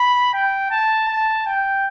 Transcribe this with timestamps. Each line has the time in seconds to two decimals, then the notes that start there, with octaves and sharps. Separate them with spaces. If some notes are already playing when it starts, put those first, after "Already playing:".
Already playing: B5
0.34 G5
0.71 A5
1.08 A5
1.46 G5